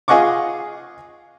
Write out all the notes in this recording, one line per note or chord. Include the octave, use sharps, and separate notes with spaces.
F4 G#4 D#5 F#5 C#6 D6